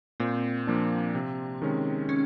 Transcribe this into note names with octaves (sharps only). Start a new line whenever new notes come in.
A#2 C4
F3 A#3 D4
C3
D#3 G#3 C#4
C#4